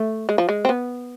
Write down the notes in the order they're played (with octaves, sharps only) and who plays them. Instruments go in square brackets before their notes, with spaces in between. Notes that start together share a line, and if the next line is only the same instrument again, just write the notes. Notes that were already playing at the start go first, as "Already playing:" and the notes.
Already playing: [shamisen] A3
G#3
F3
G#3
C4
B3